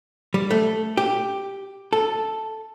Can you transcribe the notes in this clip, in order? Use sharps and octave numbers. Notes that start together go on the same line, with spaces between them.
G3
A3
G4
A4